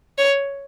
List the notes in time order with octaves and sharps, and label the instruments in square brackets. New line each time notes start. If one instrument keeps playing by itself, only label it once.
[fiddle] C#5